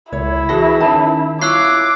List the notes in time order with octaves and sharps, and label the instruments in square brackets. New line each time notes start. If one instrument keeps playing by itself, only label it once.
[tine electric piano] C#2 [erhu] E4 [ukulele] C#5
[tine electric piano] E3 A#6 [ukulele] F#4 G#4 A5
[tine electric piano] D#3 C#4 [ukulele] A5
[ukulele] E4 [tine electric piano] F4 C#5 [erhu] D6 [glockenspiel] E6 F#6 C7